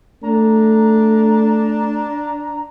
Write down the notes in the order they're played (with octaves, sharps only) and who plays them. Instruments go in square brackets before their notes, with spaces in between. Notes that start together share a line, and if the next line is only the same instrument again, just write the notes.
[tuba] A3 [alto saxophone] D4 [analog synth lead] A#5